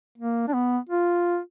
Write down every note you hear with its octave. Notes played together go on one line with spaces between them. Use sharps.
A#3
D4
B3
F4